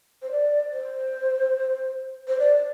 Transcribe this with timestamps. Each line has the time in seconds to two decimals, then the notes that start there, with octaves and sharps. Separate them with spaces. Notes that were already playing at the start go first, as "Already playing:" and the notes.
0.22 C5
0.31 D5
0.72 C5
2.28 C5
2.39 D5